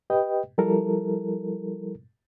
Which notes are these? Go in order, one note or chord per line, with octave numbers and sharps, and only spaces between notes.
G4 B4 D#5 G5
F3 G3 E4 A4 A#4